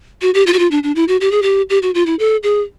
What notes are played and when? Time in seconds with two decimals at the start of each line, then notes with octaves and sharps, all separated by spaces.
0.22 F#4
0.34 G4
0.47 F4
0.53 F#4
0.59 F4
0.71 D4
0.83 D4
0.96 E4
1.08 F#4
1.21 G4
1.31 G#4
1.42 G4
1.70 G4
1.82 F#4
1.95 F4
2.06 E4
2.19 A4
2.43 G#4